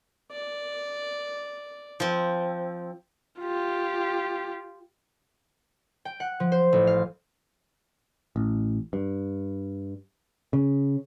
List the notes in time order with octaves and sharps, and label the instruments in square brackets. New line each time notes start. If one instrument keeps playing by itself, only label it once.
[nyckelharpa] D5
[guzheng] F3 C4
[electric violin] F4 G4
[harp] G5
F#5
F3
C5
A1
F5
[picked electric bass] A1
G2
C#3